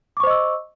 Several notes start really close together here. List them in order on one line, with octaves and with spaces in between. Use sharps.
D6 C#6 C5 D#5 E6